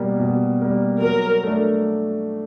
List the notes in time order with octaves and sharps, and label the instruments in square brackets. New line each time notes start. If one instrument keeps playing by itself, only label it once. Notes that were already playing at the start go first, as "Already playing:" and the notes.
Already playing: [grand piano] B2 G3 A#3
B2
G3 A#3
[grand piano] F#3 [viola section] A#4
[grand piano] A3 D4